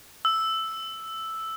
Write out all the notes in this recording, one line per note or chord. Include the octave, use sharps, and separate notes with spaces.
E6